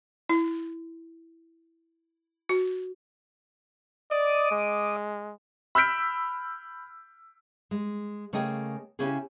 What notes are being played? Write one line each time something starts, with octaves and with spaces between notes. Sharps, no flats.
E4
F#4
D5 D#5 D6 D#6
G#3
B5 E6 F6 G6 B6 D7
G#3
C#3 A3 A#3 G#4 D#5 G5
C#3 C#4 E4 G4 G#4